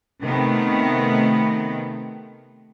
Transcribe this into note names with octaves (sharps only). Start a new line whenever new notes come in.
C3 D#3 A3 B3